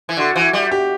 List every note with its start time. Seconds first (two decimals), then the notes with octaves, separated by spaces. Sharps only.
0.09 E3
0.17 D3 F#4
0.36 E3
0.53 G3
0.71 G4